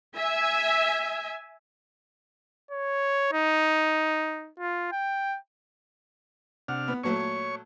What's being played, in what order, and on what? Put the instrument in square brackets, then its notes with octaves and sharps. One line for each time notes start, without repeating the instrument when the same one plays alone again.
[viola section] E5 G#5
[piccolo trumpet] C#5
D#4
F4
G5
[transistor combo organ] C3 D4 F6 [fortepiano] F#5
[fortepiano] B3
[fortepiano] A#2 F#3 A3 [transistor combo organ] C#5 C#6